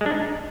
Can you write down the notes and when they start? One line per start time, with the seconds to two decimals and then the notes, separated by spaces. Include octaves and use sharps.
0.01 G#3
0.06 D4
0.11 D#4